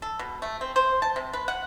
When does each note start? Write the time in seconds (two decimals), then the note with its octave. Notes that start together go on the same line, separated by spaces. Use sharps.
0.02 A4
0.19 B2
0.42 A3
0.61 C4
0.76 C5
1.02 A5
1.16 C3
1.33 B4
1.48 F#5